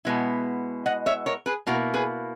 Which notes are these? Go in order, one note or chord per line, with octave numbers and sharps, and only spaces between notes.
B2 G#3 B3 E4
D#5 F#5
C#5 E5
A#4 C#5
G#4 B4
B2 A#3 E4 F#4 A#4
G#4 B4